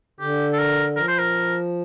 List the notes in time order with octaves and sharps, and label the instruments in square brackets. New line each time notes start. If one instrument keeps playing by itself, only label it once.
[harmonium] D3 [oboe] G4
[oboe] A4
A#4
[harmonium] F3 [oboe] A#4
[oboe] C5
A#4